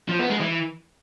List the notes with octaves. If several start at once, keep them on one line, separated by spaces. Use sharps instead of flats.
F3
B3
G#3
E3